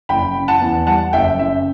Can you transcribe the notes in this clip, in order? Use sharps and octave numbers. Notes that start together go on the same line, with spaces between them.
F#1 G5 B5
C#3
F#5 A5
E2
G3 F#5 A5
F#1 E5 G5
C#3 E5